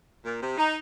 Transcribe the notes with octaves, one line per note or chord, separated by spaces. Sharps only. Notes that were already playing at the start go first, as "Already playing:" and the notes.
A#2
C3
D#4